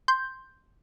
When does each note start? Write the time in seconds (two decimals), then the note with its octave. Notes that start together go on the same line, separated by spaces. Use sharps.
0.08 C6 G6